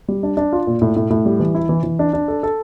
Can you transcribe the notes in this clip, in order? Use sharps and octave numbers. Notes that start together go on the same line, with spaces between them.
G3
D4
D4
F4
A#2
A2
A2
A2
G3
E3
E4
E3
E3
D4
D4
A4
A4